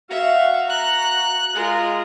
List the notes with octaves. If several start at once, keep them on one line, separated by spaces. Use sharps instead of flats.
F#4 E5 F5
A#5 F#6
G#3 F4 G#4 A#4